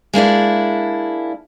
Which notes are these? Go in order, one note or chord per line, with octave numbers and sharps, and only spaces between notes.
G#3 A#3 D4 E4